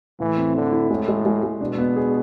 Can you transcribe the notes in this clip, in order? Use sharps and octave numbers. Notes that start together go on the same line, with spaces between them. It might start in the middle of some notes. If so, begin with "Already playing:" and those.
A2 E3
C4
D3 E4
E4
A2 G#3
G#3
G#3
G#3
B2 D4
B3
G#4